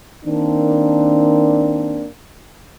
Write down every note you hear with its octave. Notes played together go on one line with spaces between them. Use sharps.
D#3 A#3 C4 D4